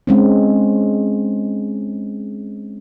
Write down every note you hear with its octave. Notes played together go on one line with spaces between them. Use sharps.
G#3 C4 C#4